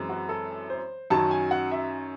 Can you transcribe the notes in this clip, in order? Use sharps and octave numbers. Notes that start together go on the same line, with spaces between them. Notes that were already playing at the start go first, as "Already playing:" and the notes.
Already playing: F#2 E3 G#3 C4
F#4
A4
C5
F#2 D#3 F#3 C#4 A5
G#5
F#5
E5